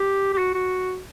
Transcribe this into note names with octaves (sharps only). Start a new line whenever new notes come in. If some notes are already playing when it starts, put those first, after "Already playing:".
Already playing: G4
G4
F#4
F#4